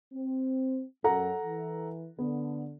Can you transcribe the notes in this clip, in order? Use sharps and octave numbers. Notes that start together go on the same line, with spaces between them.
C4
F#2 A4 F#5 A#5
E3
D3 B3